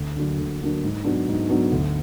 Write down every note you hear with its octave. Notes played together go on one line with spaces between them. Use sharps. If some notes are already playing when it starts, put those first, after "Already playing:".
Already playing: D2
D3 F#3 A#3 D4
D2
D3 F#3 A#3 D4
G#2
F#3 B3 D4
G#2
F#3 B3 D4
D2